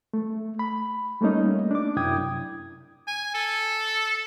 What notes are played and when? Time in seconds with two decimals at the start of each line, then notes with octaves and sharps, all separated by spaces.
0.13 A3
0.59 B5
1.21 G3 A3 A#3 C#4 D#4
1.71 D4 D6
1.96 F#2 C3 E4 G5 D#6 G#6
3.07 G#5
3.34 A4